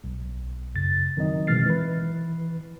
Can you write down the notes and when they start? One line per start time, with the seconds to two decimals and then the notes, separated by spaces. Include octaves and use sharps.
0.04 B1
0.75 F#2 C#3 A6
1.17 D#3 F#3 C4 D#4 D#5
1.47 B2 E3 G#3 F6 A6 C7
1.66 E3 B4